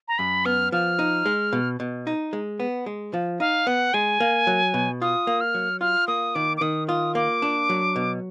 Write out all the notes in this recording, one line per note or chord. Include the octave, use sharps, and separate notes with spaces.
A#5
F#2 B5
B3 F6
F3 F6
D#4
G#3
B2
B2
D#4
G#3
B3
G#3
F3
D#4 F5
B3 F#5
G#3 G#5
A#3
F#3
B2
F4 D#6
A#3
F6
F#3
F4 F6
A#3 D#6
D#3 D6
D6
D#3 D#6
F4 D#6
A#3 D6
D4
F#3
B2